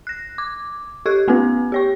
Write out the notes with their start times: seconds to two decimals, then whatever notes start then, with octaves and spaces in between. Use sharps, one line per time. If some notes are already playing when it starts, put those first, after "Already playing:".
0.07 F#6 A#6
0.38 D6
1.06 G4 A4 C#6 F#6 G#6
1.28 A3 B3 C#4 F4 B4
1.72 G4 C#5 C#6